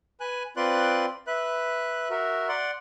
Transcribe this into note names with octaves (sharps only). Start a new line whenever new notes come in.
B4 G#5 F#6
C4 F4 B4 D5 C6 F#6
B4 E5 F#6
F#4 A#4 E5
D5 F#5 C6